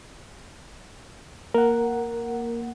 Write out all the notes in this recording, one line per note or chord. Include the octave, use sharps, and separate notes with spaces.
A#3 A#4 F#5